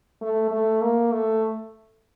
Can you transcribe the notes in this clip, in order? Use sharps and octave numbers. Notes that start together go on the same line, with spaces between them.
A3
A3
A#3
A3